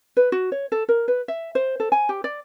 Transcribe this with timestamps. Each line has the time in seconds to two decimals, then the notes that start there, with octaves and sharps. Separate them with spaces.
0.17 B4
0.32 F#4
0.52 C#5
0.72 A4
0.89 A#4
1.08 B4
1.28 E5
1.55 C5
1.80 A4
1.92 G#5
2.09 G4
2.24 D5